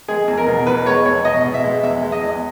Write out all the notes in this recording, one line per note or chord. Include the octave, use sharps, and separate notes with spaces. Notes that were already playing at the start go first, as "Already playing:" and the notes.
G#3 G#4
E2
A#4
B2
E2 B4
G#3 C#5
E2 C#5
B2 D#5
B2
E5
G#3
E2 E5
G#3
D#5
E2